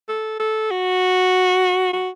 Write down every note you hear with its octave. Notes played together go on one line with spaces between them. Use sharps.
A4
A4
F#4
F#4